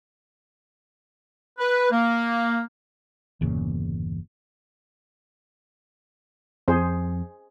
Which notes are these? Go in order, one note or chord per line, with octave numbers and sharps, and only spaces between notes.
B4
A#3
G1 E2 A#2 C#3
F2 G#4 C5